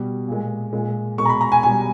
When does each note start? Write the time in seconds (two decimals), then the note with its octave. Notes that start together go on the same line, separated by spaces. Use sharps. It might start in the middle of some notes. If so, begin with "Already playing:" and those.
Already playing: B2 G3
0.28 A#2 G#3
0.73 A#2 G#3
1.18 B2 G#3 C#6
1.25 A#5
1.29 B5
1.41 A#5
1.52 G#5
1.63 B2 G3 G#5